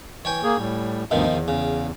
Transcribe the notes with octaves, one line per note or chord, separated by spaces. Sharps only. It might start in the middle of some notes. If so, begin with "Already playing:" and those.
E3 C#5 G5 G#5
A#3 G#4
A2 G3
D2 G2 B2 D#3 F3
E2
C#3